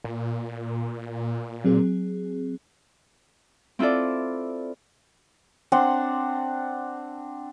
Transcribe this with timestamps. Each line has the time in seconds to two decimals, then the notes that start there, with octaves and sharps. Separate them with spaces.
0.04 A#2
1.65 F#3 C4 G#4
3.79 C4 E4 F4 A4 D5
5.72 C4 D4 F#5 C6